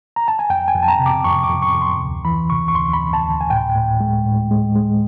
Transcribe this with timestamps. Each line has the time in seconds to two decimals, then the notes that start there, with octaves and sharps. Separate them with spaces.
0.16 A#5
0.28 A5
0.39 G#5
0.50 F2 G5
0.68 G#5
0.75 F2
0.83 A5
0.88 A#5
0.99 C3
1.06 D6
1.24 F2 C#6
1.44 D6
1.50 F2
1.62 C#6
1.75 F2
1.81 C6
2.00 D2
2.25 E3 B5
2.50 C3 C#6
2.68 C#6
2.75 D2 C6
2.93 B5
3.01 D2
3.13 A5
3.25 D2
3.41 G#5
3.50 A2 G5
3.76 A2
4.00 G#3
4.26 A2
4.51 G#3
4.75 G#3